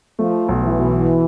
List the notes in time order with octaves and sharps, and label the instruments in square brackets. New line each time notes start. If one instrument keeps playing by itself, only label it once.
[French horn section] F3 [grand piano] A3
[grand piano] B1
[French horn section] E3
[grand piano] B2